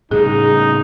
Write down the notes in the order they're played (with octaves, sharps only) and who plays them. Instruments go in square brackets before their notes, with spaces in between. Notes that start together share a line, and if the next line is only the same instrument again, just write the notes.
[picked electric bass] A2 C#3 G3 [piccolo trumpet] D#4 [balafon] G#4